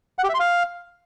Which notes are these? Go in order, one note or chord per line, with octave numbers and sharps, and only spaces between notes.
F#5
G4
E5
C6
F5